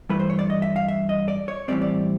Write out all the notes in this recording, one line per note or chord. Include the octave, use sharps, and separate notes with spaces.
G2 E3 A3 B4
C5
C#5
D5
D#5
E5
F5
E5
D#5
D5
C#5
A2 E3 G3 C4 D5
D5